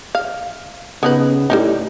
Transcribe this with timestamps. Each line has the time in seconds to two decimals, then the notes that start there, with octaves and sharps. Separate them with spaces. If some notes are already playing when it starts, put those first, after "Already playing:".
0.15 F5
1.03 C#3 B3 D#4 B4
1.50 A2 G3 D4 D#4